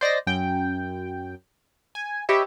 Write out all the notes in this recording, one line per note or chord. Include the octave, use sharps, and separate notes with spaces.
C5 D5 D#5 A#6
F#2 G5
G#5
G4 B4 C#5 D#5 E5